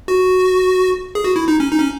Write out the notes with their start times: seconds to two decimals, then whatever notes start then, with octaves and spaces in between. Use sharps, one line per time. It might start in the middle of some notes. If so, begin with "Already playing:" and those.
0.08 F#4
1.15 G#4
1.24 F#4
1.36 E4
1.48 D#4
1.60 C#4
1.71 D#4
1.80 C#4